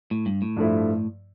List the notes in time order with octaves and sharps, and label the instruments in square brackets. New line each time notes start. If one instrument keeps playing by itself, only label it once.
[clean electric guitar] A2
G2
A2
[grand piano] G2 F3 A3 E4